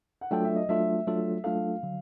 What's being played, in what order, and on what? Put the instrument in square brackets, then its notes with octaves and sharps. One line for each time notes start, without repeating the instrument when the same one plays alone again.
[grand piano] F#5
[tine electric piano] F#3 A3 D4 F4 A4 [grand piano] G5
[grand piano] E5
D#5
[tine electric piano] F#3 A3 D4 F4 A4 [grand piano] E5
[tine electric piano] F#3 A3 D4 F4 A4
[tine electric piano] F#3 A3 D4 F4 A4 [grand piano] F5
[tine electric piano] D3 F#3